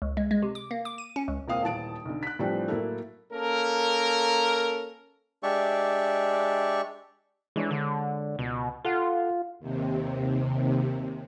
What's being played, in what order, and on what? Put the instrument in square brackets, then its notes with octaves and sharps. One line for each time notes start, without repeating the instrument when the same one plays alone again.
[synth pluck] C#2
G#3
G#3
C3
D6
A#3
D6
D#7
C#4
C#2
[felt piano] E1 A#3 C4 F5 D#6
D#1 E3 A5 D7
B1 D3
F#6 B6
A2 E3 F3 G3 C4 D4
A2 F#3 A#3 E4 A4
[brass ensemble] A#3 C#4 A4 A#4
[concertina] G#3 D4 G4 D5 E5 C#6
[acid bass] E3 [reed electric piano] G#3 D4 C#5
[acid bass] D3
[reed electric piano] C#2 [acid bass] B2
[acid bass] F4 [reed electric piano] A4 F#5
[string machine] D#2 C3